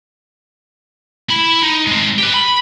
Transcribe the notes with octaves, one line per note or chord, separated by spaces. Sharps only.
E4 B5
D#4
G#3 C4
G4 B4
B5